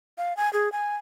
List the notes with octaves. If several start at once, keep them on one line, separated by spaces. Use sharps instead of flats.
F5
G#5
G#4
G#5